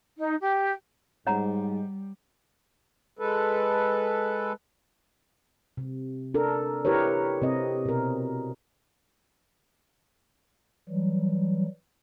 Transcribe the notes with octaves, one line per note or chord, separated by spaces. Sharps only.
D#4
G4
G#2 G3 C#5 F#5 A#5
G#3 A4 B4
C3
D4 A4 A#4
E4 G4 A#4 B4 C#5
C3 C4 D#5
B2 A#4
E3 F#3 G3